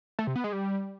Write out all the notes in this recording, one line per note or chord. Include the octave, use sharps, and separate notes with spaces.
A3
C3
B3
G#3
G3